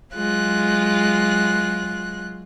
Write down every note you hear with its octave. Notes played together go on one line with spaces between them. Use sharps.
F#3 G#3 F4 F#6